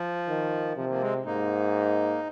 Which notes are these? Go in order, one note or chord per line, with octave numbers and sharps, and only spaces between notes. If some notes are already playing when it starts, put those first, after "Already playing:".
Already playing: F3
D#3
C3 F3
F3 A#3
G#3 C4
G#2 A#3 D#4